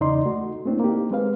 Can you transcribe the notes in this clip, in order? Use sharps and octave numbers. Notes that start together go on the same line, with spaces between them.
E2 C#3 D#4 D5 D#5 C6
A3 F#4
A3 A#3 C4 D4 E4
A#3 D#4 G4
G#3 C4 B4 F5